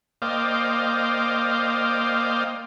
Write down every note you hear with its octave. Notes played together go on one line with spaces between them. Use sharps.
A#3 C5 D5 D#5 F5 G5